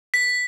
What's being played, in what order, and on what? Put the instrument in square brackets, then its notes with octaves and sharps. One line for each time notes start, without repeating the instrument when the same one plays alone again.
[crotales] B6